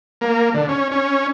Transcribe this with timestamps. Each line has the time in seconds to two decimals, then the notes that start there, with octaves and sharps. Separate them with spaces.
0.21 A#3
0.54 D3
0.68 C#4
0.91 C#4